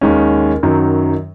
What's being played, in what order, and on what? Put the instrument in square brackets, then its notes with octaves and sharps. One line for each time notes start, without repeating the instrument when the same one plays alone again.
[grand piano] D#2 D#3 G#3 C#4
F#2 D#3 F#3